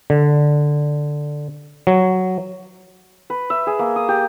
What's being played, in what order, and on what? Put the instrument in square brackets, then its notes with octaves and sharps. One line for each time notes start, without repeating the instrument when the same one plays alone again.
[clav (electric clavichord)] D3
F#3
[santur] B4
E5
G#4
A#3
D#6
G4